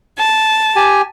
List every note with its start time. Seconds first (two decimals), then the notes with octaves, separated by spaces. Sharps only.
0.17 A5
0.76 G4 G#5